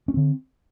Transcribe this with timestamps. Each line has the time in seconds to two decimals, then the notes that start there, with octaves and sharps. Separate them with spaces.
0.08 C#4
0.14 D3 C4